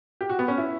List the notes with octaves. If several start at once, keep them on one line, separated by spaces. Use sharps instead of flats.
G4
F#4
B3
C#4
E4